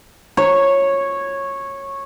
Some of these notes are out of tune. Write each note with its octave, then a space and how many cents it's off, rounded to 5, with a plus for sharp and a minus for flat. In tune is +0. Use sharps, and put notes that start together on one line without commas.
C#5 -10